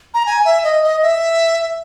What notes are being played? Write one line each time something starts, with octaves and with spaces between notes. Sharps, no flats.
A#5
G#5
E5
D#5
D#5
E5